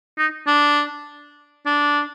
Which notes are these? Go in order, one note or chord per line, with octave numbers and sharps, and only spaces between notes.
D#4
D4
D4